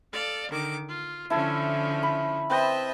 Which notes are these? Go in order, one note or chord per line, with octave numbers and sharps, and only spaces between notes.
A4 D5 F5
D3 D#3 D6
F4
D3 F3 C#4 E4 A5
B5
C4 B4 D#5 E5 G5 A5